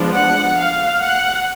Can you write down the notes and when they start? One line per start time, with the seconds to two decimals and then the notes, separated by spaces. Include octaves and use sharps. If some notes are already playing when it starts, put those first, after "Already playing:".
Already playing: F3 G#3 B3 D4
0.15 F#5
0.58 F5
1.02 F#5